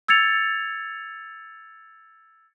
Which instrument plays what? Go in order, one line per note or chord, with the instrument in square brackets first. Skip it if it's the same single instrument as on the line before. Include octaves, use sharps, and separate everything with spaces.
[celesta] E6 G#6 A6 C#7 F7